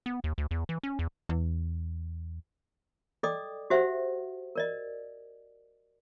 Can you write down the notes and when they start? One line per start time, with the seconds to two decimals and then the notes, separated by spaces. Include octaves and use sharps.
0.06 B3
0.24 D#2
0.38 D2
0.51 E2
0.69 E3
0.83 C#4
0.99 E2
1.29 E2
3.23 A4 D5 D#5 G5 D6 D#6
3.70 F#4 G4 C5 E5 F#5
4.55 A#4 D5 D#5